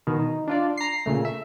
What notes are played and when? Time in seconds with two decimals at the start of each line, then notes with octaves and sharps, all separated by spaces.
0.07 B2 D#3
0.19 D#4
0.47 D4 F4 D5
0.77 A#5 C7
1.06 A#2 C#3 A3
1.25 E5